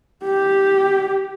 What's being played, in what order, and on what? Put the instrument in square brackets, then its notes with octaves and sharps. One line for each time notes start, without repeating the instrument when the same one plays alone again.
[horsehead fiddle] G4